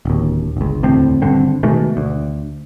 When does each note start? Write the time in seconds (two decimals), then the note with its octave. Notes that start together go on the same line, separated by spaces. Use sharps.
0.05 D1 D#2
0.57 G1 C#2
0.83 E1 D2 A2 C4
1.22 G#1 G2 D3 C4
1.63 B2 D#3 G#3 A3
1.97 D2